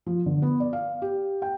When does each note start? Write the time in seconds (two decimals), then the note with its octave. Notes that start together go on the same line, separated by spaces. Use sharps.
0.06 F3
0.26 D3
0.42 B3
0.60 D5
0.73 F5
1.02 G4
1.42 G5